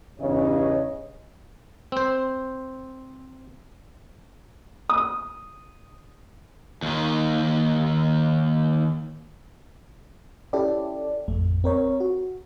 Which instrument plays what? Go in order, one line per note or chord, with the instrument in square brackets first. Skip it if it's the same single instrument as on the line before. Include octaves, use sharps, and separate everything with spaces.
[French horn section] E2 G2 C#3 [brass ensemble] C#5 D#5
[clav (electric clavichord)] C4 C5
[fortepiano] D#6
[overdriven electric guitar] D#2 D#3
[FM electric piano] C#4 E4 G4 A4 D5
A1 F2 A3
C4 A#4 C#5
F#4